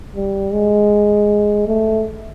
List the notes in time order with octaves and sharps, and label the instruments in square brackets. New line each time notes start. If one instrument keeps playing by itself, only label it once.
[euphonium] G3
G#3
A3